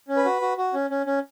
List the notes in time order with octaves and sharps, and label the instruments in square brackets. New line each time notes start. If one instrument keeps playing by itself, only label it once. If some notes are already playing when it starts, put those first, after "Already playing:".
[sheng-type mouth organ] C#4
B4
F#4
F#4
F#4
C#4
C#4
C#4